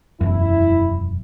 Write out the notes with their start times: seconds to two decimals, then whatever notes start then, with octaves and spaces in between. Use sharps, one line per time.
0.21 E1 F#2 E4